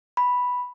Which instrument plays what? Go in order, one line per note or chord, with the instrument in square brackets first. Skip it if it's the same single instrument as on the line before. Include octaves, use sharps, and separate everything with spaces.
[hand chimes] B5